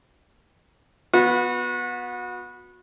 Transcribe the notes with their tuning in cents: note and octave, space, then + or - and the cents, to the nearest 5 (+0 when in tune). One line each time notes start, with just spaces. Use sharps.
B3 -5 F#4 -30